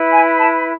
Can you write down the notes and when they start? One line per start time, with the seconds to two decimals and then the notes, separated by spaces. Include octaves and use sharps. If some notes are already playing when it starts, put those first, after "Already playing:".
Already playing: E4 B4
0.11 G#5
0.39 A5